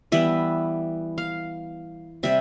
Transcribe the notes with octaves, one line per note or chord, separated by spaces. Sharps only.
E3 G3 B3 E5
F5
C3 G3 E5